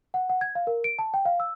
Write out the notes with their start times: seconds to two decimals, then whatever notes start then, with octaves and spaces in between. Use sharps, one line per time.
0.14 F#5
0.29 F#5
0.41 G#6
0.55 F5
0.67 A#4
0.84 D7
0.99 A5
1.14 G5
1.25 F5
1.40 E6